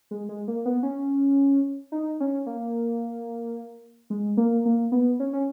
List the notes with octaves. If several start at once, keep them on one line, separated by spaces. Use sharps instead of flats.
G#3
G#3
A#3
B3
C#4
D#4
C#4
A#3
G#3
A#3
A#3
B3
C#4
C#4